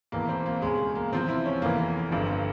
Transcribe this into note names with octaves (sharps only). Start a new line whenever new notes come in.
E1 E2 E3 A#3
C4
A#3
E1 E2 C#3 G#3
A#3
E2 C3 F3 C4
E4
C#4
F1 E2 E3 A#3
G1 G2 F3